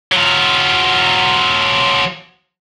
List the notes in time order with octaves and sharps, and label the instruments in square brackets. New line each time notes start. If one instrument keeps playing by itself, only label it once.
[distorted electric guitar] F#3 F4